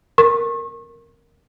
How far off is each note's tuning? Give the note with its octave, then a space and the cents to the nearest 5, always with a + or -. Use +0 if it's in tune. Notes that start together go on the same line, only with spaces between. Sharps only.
A#4 +0 C#6 -35